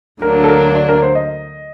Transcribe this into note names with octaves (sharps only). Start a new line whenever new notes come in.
D2 D3 F#3 A#3 D4 A#4
A4
A#4
D5
A#4
C5
D#5